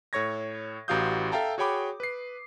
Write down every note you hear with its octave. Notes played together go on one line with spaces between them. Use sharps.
A2 A4 C#5 C#6 G#6 A#6
A1 F#4 G4 F5 D#6 G6
A4 E5 F5 G5 A5 A#5
F#4 G#4 C#5 G5 B5 D6
B4 C7